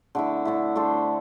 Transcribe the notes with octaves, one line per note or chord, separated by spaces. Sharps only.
D3 A3 E4
D3 A3 E4
A3 D4 A4 C5